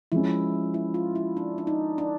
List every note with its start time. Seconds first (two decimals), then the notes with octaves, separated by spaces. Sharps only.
0.12 F3 G#3 C#4 E4
0.74 E4
0.94 F4
1.15 E4
1.37 D4
1.58 D4
1.67 D#4
1.98 D4